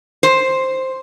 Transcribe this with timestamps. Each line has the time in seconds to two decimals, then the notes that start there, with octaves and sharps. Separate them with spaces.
0.23 C5